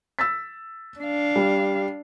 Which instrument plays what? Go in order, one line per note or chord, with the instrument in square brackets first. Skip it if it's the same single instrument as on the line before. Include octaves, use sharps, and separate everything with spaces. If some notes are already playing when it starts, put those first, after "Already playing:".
[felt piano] E6 A6 B6
[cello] D4 F5
[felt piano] G3